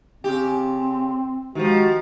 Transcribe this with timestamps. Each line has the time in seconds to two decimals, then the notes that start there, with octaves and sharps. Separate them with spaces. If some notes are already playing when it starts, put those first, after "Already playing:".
0.24 C#3 C4 G4
1.55 D#3 F3 G#3 F#4 G4